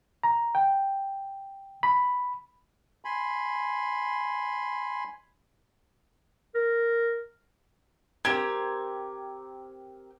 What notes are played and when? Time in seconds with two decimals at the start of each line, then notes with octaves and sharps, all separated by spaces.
0.24 A#5
0.55 G5
1.83 B5
3.05 G#5 B5 C6
6.55 A#4
8.25 C4 G4 A#4 G#6